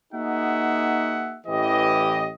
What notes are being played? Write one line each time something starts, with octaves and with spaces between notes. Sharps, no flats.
A#3 D#4 F#4 G#4 E5 F#5
A1 E3 G4 D#5